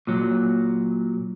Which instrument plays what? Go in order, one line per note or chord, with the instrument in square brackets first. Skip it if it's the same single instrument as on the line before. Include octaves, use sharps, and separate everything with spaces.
[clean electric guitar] A#2 F#3